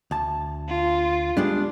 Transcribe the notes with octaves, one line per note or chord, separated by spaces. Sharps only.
D2 A5
F4
G3 G#3 B3 D4